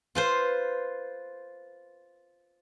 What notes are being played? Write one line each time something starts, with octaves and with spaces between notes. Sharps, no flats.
F4 B4 C5